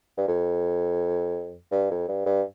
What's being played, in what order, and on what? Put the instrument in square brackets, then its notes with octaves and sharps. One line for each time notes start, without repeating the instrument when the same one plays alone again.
[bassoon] G2
F2
G2
F2
G2
G2